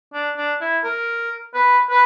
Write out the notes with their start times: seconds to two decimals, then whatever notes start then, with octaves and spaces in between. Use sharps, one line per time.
0.13 D4
0.37 D4
0.61 E4
0.83 A#4
1.54 B4
1.90 B4